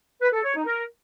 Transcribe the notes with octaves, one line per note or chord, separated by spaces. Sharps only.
B4
A4
C#5
D#4
A#4